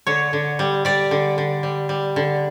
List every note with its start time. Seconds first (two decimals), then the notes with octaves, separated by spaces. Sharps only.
0.07 D3 C#5
0.33 D3
0.59 G3
0.85 G3 D5
1.11 D3
1.38 D3
1.63 G3
1.89 G3
2.16 D3